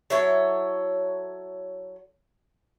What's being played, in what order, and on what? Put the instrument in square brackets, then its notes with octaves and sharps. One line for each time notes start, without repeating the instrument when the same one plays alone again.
[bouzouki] F#3 E4 A4 C#5